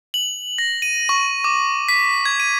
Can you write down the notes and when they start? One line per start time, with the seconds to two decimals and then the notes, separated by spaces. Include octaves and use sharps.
0.14 F#7
0.58 A#6
0.82 D#7
1.09 C#6
1.44 D6
1.89 B6
2.25 G#6
2.40 D#7